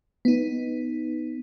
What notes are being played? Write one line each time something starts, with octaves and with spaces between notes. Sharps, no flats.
B3 D#4